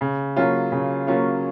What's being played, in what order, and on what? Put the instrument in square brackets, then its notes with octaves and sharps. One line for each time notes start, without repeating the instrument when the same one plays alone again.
[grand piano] C#3
F#3 A#3 C#4 F4
C#3
F#3 A#3 C#4 F4